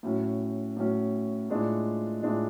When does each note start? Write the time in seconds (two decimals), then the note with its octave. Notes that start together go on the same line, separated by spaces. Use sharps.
0.03 A2 F#3 C#4
0.77 A2 F#3 C#4
1.50 A2 G#3 D4 F4
2.23 A2 G#3 D4 F4